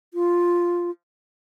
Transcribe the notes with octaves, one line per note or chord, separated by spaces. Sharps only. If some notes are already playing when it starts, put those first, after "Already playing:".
F4